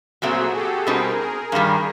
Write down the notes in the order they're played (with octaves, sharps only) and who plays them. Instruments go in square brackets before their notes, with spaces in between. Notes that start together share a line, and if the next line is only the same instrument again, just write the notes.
[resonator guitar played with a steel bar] A#2 F#3 A3 C4 [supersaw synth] F#4 G#4
[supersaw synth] G4 A4
[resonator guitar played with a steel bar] B2 G3 C4 D#4 [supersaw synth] G#4 A#4
[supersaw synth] G#4 A#4
[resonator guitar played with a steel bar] G2 D#3 G3